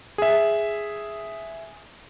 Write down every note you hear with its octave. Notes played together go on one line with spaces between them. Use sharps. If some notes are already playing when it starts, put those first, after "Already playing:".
G#4 E5